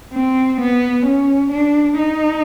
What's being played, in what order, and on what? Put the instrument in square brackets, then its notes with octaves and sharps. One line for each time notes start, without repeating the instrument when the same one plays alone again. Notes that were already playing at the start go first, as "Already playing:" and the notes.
[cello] C4
B3
C#4
D4
D#4